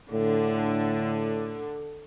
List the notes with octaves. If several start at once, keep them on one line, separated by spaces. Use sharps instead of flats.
A2 D3